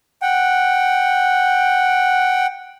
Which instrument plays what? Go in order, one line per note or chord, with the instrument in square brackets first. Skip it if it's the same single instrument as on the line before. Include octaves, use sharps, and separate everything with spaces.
[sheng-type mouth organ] F#5 G5